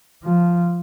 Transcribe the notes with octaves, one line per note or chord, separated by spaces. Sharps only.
F3